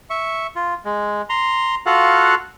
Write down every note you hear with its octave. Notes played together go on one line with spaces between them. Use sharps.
E5 C#6
F4
G#3
A#5 C6
F4 F#4 A4 F5 F#5